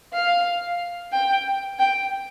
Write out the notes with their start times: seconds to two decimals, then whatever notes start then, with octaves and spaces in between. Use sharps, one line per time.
0.14 F5
1.12 G5
1.79 G5